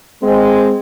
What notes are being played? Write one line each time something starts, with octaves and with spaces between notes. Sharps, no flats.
G#3 C4